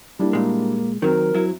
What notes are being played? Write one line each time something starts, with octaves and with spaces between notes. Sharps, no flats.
G3 A#3 D4 E4
A#2 G#3
D#3 F#3 C4 A#4
F#3 E4